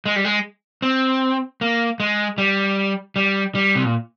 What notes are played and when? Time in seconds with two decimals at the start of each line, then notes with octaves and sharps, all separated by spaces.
0.06 G#3
0.16 G3
0.25 G#3
0.82 C4
1.61 A#3
2.00 G#3
2.38 G3
3.16 G3
3.55 G3
3.75 C3
3.85 A#2